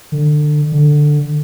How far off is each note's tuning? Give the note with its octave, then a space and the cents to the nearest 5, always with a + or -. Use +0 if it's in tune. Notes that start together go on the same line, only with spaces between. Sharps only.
D3 +25
D3 +10